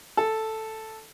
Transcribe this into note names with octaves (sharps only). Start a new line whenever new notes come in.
A4